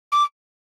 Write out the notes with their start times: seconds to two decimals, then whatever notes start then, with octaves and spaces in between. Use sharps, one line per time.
0.12 D6